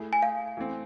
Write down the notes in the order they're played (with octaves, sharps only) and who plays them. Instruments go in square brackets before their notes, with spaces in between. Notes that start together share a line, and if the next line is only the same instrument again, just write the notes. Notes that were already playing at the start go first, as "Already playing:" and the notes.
Already playing: [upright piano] A3 E4 G#4
[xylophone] G#5
F5
[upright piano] E3 A3 C4